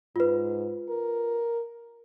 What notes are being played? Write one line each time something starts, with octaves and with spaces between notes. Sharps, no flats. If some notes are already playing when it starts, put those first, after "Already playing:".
G#2 F4 B4
A#4